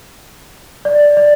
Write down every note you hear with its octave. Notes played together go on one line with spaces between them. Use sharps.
D5
D5